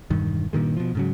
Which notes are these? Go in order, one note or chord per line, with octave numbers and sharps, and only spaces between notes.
E1 G2 D#3
G2 A#2 D#3 G#3
B2 F3
G#2 C#3 F#3